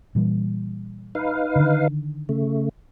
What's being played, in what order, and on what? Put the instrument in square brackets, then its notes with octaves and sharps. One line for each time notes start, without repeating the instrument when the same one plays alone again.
[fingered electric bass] A#2 E3 G3
[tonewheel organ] D#4 B4 F5
[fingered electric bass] D3 D#3
[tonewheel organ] C#3 A3